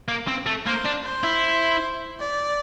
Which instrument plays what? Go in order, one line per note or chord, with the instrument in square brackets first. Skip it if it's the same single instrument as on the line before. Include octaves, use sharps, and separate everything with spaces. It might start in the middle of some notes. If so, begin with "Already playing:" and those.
[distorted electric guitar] A#3
C4
A3
[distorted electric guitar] A#3 [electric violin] C5
[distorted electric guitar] D4
[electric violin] C5
[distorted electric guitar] E4
[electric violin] D5